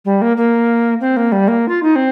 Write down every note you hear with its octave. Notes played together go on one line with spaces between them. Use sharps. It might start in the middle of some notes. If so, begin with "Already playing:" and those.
G3
A#3
A#3
C4
A#3
G3
A#3
F4
D#4
C4